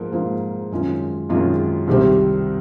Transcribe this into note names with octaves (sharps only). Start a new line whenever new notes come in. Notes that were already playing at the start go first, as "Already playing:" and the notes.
Already playing: G#2 F3 A#3
G#2 F3 A#3
F#2 D#3 G#3 C#4 F4
F#2 D#3 G#3 C#4 F4
C2 C3 D#3 G3 C4